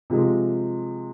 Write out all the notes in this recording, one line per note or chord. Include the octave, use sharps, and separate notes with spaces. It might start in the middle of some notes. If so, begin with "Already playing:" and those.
C3 F3 G#3